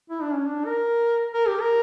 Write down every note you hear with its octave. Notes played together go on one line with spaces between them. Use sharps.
E4
D4
C#4
D4
A#4
A#4
G4
A#4